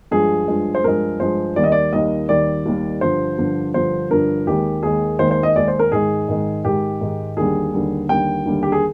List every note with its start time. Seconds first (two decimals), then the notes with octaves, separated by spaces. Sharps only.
0.11 G2 F3 G#3 G#4
0.48 G2 F3 G#3
0.75 C5
0.84 G2 F3 G#3 A#4
1.20 G2 F3 G#3 C5
1.56 D#2 D#3 G3 D5
1.64 D#5
1.72 D5
1.93 D#2 D#3 G3 D#5
2.29 D#2 D#3 G3 D5
2.65 D#2 D#3 G3
3.01 G2 D3 F3 C5
3.38 G2 D3 F3
3.74 G2 D3 F3 C5
4.10 G2 D3 F3 A#4
4.47 D#2 D#3 G#3 G4
4.83 D#2 D#3 G#3 G#4
5.19 D#2 D#3 G#3 C5
5.31 C5
5.43 D#5
5.56 D#2 D#3 G#3 D5
5.68 C5
5.79 A#4
5.92 G#2 D#3 G#3 G#4
6.28 G#2 D#3 G#3
6.64 G#2 D#3 G#3 G4
7.01 G#2 D#3 G#3
7.37 D#2 D3 G3 G#4
7.74 D#2 D3 G3
8.09 D#2 D3 G3 G5
8.45 D#2 D3 G3
8.63 G4
8.72 G#4